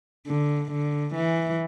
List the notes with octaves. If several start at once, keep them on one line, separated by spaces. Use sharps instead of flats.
D3
D3
E3